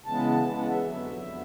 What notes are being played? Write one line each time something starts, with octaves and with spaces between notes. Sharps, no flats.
C#3 E3 G#3 B3 A5
C#3 E3 G#3 B3 A5
F#5
E5
F2 D3 F#3 B3
F2 D3 F#3 B3